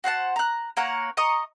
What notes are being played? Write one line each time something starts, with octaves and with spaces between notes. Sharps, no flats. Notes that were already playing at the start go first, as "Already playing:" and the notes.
F#4 C5 F#5 A5
A#5 F#6
A#3 C#5 F#5 A#5
D#5 A#5 C#6 D#6